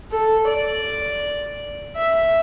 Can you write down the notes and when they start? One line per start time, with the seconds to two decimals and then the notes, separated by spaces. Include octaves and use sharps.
0.11 A4
0.48 D5
1.96 E5